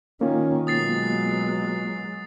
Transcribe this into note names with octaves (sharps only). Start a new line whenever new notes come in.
D#3 A#3 C#4 F4
B2 F#3 G#3 D#6 A6 C7